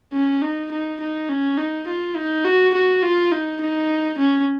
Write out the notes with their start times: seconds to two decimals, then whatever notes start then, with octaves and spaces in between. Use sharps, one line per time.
0.13 C#4
0.42 D#4
0.71 D#4
1.01 D#4
1.29 C#4
1.58 D#4
1.87 F4
2.16 D#4
2.45 F#4
2.74 F#4
3.03 F4
3.32 D#4
3.61 D#4
4.18 C#4